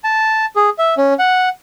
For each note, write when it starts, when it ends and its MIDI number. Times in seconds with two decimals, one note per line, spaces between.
0.04 0.46 81
0.56 0.69 68
0.78 0.94 76
0.97 1.14 61
1.19 1.49 78